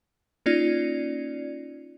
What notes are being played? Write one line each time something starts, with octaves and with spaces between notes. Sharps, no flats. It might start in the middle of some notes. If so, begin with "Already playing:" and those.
A#3 C#4 D#4 F4 D5